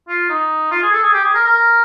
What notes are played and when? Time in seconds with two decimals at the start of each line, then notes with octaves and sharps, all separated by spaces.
0.08 F4
0.29 D#4
0.71 F4
0.82 G#4
0.93 A4
1.03 G#4
1.13 G4
1.24 G#4
1.34 A#4
1.45 A#4